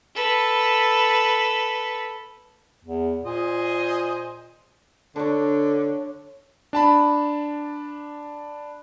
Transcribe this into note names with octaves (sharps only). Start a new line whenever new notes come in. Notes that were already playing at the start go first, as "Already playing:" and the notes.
A4 B4
E2
A#2 G#4 C5 D#5
D3 D4 C#5
D4 A5 B5